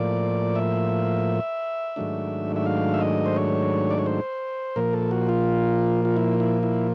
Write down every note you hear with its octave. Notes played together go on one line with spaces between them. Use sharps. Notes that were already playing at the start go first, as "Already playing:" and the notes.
Already playing: A2 F3 A#3 D5
E5
G#2 D#3 F#3 A3 D4
E5
F5
E5
D#5
C5
C#5
D5
C#5
C5
A#2 F3 A#3 A#4
A4
F#4
F4
F4
E4
E4
E4